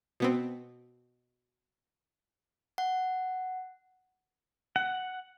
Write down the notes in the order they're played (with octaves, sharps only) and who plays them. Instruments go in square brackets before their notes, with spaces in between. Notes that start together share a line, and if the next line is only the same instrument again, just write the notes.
[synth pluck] B2 B3 C4
[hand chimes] F#5
[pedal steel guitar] F#5